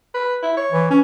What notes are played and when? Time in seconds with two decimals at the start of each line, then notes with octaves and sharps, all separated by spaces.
0.14 B4
0.43 E4
0.57 C#5
0.72 E3
0.90 C#4